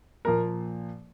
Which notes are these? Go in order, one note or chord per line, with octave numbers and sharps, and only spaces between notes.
A#2 F3 A#3 A#4